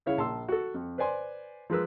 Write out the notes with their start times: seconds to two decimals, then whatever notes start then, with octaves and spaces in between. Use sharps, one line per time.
0.06 C#3 E4 C#5 F5
0.18 A#1 A5 C6 E6
0.48 F#4 A4
0.74 F2
0.98 B4 C5 D5 G#5 C6
1.70 F3 G#3 A#4 B4 E6